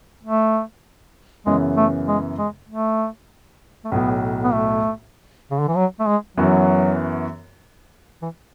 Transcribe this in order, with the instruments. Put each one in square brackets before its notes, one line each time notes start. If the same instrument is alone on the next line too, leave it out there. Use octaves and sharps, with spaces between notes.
[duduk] A3
[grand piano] F#2 C#3 E3 B3 [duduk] G#3
[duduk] A3
G#3
G#3
A3
A3
[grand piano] B1 A2 F#3 [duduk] B3
[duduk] B3
A3
C#3
D3
E3
F#3
A3
G#3
[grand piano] F#2 E3 B3 F#4 [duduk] F#3
[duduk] E3